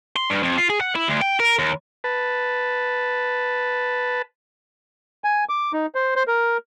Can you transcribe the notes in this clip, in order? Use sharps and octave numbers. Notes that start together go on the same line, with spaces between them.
C6
G2
F2
F4
G#4
F#5
E4
D2
G5
A#4
D#2
B4 A5
G#5
D6
D#4
C5
C5
A#4